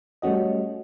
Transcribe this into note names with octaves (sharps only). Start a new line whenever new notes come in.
G3 A3 C#4 F#4 D#5